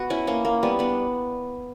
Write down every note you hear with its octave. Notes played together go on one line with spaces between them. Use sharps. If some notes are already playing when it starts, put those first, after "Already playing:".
Already playing: B3 F#4
C#4 E4
A#3 C#4
A#3
G3 B3
B3 D4